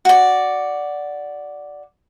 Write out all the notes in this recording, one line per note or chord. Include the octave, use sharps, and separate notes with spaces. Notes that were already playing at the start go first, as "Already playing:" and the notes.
F#4 D5